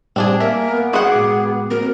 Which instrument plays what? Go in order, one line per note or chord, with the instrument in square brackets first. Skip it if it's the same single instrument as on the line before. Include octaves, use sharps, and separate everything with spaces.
[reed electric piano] A2 G3 [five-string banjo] C4 D4 G#4
[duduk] A#3 [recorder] A#4 [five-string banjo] E5 [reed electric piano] G#5
[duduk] B3
[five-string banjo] F#4 F#5 G5 [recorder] G#4 [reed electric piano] B5 C6 D#6
[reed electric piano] A2 G#3 D6
[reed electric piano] A#3 C4 F#4 [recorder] A#4